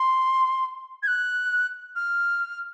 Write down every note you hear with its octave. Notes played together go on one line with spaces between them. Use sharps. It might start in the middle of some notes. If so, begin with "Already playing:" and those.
Already playing: C6
G#6
F#6
F6